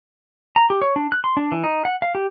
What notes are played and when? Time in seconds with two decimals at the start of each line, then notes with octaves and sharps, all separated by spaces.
0.56 A#5
0.70 G4
0.82 C#5
0.96 D4
1.12 F#6
1.24 C6
1.37 D4
1.52 E3
1.64 D#4
1.85 F#5
2.02 F5
2.15 G4